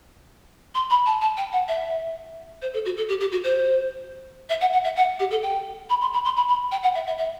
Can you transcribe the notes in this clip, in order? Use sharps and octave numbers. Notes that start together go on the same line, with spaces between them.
C6
B5
A5
A5
G5
F#5
E5
C5
A4
F#4
A4
G4
G4
F#4
C5
E5
F#5
F#5
E5
F#5
G4
A4
G5
B5
C6
B5
C6
B5
B5
G5
F#5
E5
E5
E5